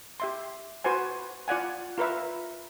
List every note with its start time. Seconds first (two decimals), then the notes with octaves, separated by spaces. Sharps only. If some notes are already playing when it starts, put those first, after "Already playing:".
0.20 G4 E5 C6
0.84 F#4 B4 C5 G#5
1.48 F4 D5 F#5 G#5
1.98 F4 A#4 B4 E5